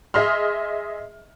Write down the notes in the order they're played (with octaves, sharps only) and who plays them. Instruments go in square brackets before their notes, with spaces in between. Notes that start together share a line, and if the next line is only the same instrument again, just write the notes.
[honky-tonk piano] G#4 D#5 E5 C6 F6